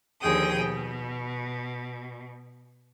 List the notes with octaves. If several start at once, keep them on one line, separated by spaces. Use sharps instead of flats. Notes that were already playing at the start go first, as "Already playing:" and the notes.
D#2 D3 F3 G#4 G5 D#6
B2